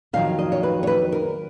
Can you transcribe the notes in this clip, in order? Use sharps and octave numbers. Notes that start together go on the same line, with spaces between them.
F2 D#3 F#3 F5
D#5
C#5
B4
C#5
B4
A#4